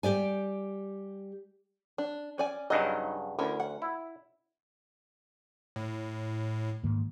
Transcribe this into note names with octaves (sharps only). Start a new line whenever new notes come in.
G3 G4 D5 G#5
D4
C#4 D5 G#5
G2 C#3 F#3 D#4 D#5
D2 C#4 E4 A#4
F#5
E4
A2
G#2 D#3 A#3